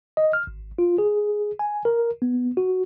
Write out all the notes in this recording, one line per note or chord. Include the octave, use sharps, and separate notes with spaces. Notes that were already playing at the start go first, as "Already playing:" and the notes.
D#5
F6
G#1
F4
G#4
G#5
A#4
B3
F#4